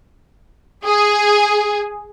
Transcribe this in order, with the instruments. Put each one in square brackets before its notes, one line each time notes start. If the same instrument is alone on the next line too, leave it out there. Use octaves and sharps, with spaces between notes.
[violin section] G#4